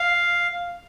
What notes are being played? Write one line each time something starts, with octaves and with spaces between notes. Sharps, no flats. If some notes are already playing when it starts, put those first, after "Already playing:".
Already playing: F5